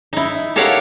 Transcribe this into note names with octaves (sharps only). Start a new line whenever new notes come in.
D#4 E4
G4 A4 A#4 C#5 F5 F#5